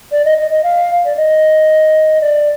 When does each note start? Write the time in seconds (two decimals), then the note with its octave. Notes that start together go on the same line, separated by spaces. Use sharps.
0.12 D5
0.25 D#5
0.38 D#5
0.51 D#5
0.63 F5
1.05 D5
1.16 D#5
2.21 D5